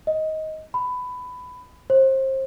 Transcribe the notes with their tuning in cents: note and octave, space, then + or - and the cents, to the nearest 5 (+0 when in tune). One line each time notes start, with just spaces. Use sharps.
D#5 +15
B5 +15
C5 +30